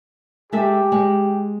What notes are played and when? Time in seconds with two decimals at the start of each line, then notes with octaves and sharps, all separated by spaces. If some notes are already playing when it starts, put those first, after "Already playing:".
0.52 G#3 G4 A4 E5
0.92 G#3